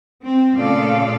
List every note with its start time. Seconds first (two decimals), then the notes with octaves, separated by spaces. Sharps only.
0.23 C4
0.56 A#2 C#3 A3 A4 D5 F5